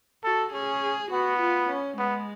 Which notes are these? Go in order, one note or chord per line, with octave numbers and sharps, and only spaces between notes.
F#4 A4
C#4 G#4
B3 F#4
F4
C#4
G#3 B3